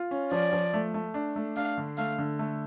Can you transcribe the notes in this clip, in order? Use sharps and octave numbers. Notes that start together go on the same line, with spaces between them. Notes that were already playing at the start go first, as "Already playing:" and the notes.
Already playing: F4
C#4
F3 D5
F3
A3
A3
D4
A3
D4 F5
D3
A3 F5
D3
A3